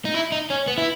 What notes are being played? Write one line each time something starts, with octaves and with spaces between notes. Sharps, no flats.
D#4
E4
D#4
C#4
B3
E4